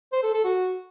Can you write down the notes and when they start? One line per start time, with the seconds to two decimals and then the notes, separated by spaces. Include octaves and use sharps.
0.12 C5
0.23 A4
0.33 A4
0.44 F#4